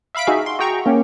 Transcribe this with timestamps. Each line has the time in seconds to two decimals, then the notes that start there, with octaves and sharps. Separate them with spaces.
0.15 E5 F5 B5 B6 D7
0.27 D#4 F#4 G#4 E5 F5
0.46 C6
0.59 F#4 G#4 G5 A#5 C#6
0.86 A#3 C#4 G4